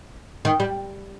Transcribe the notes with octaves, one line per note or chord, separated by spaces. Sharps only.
D#3
G3